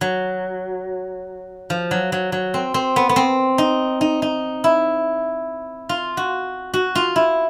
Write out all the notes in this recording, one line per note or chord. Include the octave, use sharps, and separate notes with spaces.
F#3
F3
F#3
F#3
F#3
C4
C4
B3
B3
C4
D#4
D#4
D#4
E4
F4
F#4
F#4
F4
E4